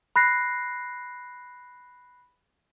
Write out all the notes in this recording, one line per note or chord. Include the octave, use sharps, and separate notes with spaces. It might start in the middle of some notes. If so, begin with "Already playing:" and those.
B5 F#6 A#6 C7